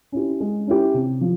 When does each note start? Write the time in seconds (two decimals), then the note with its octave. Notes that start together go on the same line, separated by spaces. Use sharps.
0.12 C#4 E4 G4
0.40 G#3
0.67 C#4 E4 G4
0.94 C3
1.21 F3